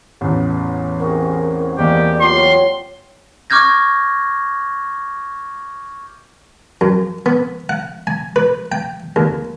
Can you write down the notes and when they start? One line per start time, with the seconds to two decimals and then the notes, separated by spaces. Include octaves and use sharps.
0.21 A1 E2
1.00 C3 F#4 G#4 A#4
1.78 E2 G3 G#3 A#3 G4 D5
2.21 F#3 G3 F4 G4 C6
3.50 C#6 D6 F6 G6 G#6 A#6
6.81 F#2
7.26 B3
7.69 F#5
8.07 G#5
8.36 B4
8.72 G5
9.16 D#2